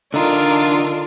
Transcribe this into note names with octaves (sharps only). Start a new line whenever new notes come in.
D3 D4 D#4 F4 A#4